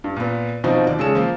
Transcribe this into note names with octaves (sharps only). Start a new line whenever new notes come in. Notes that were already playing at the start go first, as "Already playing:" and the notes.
G2
A#2 B3
B2 F3 C4 D#4 F#4
D#2 D5
C#3 G#3 G#4 A4 C#5 E7
F3 A#3